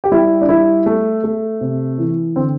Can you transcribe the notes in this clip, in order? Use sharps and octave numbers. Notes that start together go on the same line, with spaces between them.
G4
G3 E4
D4
G3 E4
A3
A3
C3
E3
D3 C4